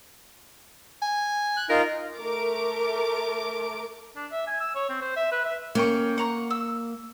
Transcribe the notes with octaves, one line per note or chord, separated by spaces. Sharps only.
G#5
F#6
D#4 F4 A#4
A3 A#4 D6 D7
D4
E5
G#5
E6
C#5
C4
C5
E5
B4
E5
A#3 C#4 G5 C#6
F#5 A#5 C#6
E6